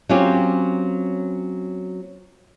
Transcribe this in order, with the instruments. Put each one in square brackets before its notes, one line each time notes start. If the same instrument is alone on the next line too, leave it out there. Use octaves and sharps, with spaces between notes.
[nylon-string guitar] F#3 A#3 C4 C#4 F4 G4